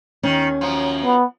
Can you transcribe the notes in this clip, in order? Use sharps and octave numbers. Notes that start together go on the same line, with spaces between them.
D#2 D#3 C#4
F#2 F3
B3